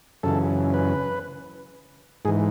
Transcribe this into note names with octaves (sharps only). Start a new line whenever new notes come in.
F#2 C#3 E3 A4
B4
G#2 E3 G#4